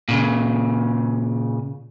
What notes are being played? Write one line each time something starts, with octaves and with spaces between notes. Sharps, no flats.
A#2 C#3